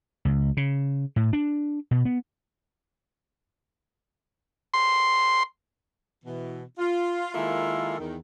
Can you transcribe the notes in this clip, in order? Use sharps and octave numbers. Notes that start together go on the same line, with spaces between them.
C#2
C#3
A2
D4
B2
B3
C6
B2 E3
F4
D#3 G#3 A#3 E4 F4 A4
E2 D#3